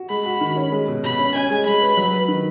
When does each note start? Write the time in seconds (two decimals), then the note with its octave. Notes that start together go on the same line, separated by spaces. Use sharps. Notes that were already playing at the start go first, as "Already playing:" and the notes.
Already playing: F#4
0.09 G#3 B5
0.26 F#4
0.41 D#3
0.56 C#4
0.72 G#3
0.88 B2
1.03 B2 B5
1.19 C#4
1.34 C#4 G#5
1.51 G#3
1.66 G#3 B5
1.82 B4
1.97 F#3
2.13 B4
2.28 D#3